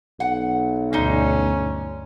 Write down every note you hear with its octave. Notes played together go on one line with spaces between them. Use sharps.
B1 F#5
D2 G2 B2 D3 C#4 D#4